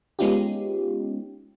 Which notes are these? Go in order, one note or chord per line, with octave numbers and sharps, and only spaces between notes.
G#3 B3 C#4 D#4 F4 G4